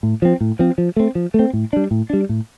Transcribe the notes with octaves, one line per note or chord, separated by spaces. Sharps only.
A2
F3 C4
A2
F3 C4
F3
A3 C4
F3
A3
C4
A2
G3 D4
A2
G3 D4
A2